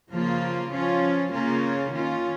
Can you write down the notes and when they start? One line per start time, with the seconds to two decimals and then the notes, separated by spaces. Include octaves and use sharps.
0.11 C#3 F3 A#3 F4
0.72 F3 C#4 F4
1.32 C#3 A#3 C#4 F4
1.93 D#3 C#4 F4